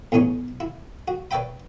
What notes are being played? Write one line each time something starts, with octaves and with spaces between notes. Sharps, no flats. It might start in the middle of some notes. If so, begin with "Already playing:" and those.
E2 A2 C#4 D#4 C#5
E4
F#4
B4 C#5 D5 E5 G5 B5